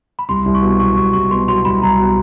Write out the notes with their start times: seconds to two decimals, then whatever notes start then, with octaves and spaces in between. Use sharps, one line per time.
0.19 B5
0.29 C2 C6
0.45 C2
0.55 C#6
0.62 B2
0.80 F#3 C#6
0.97 C2 C#6
1.13 C2 C#6
1.30 B2 C6
1.48 F#3 C6
1.65 C2 B5
1.82 C2 A#5
1.99 B2